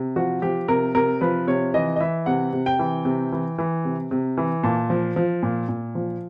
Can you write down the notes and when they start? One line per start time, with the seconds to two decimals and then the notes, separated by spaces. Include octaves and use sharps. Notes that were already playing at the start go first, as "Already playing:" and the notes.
Already playing: C3
0.16 F3 F#4
0.42 F3 G4
0.68 C3 A#4
0.95 C3 A#4
1.21 F3 B4
1.47 C3 C#5
1.74 E3 D#5
1.96 D#5
2.00 E3 E5
2.26 C3 F#5
2.53 C3
2.66 G5
2.79 E3
3.05 C3
3.32 E3
3.58 E3
3.85 C3
4.11 C3
4.37 E3
4.63 A#2 A5
4.90 F3
5.16 F3
5.43 A#2
5.69 A#2
5.95 F3